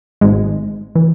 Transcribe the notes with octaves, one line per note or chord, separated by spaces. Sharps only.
G#1 G#2 G#3
E3